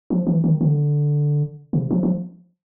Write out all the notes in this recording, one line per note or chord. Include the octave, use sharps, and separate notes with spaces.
F3
E3
D#3
D3
C#3
C3
F3
F3